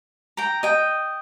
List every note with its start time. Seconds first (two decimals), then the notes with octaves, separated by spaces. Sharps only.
0.37 G5 A#5
0.63 D#5 G5